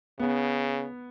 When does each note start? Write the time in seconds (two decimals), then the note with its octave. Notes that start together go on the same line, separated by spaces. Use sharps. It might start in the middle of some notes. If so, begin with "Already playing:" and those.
0.19 C#3 B3